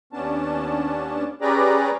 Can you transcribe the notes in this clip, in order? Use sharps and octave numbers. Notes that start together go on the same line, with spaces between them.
D#2 B3 C#4 D4 A5
C#4 G4 G#4 B4 D5 A#5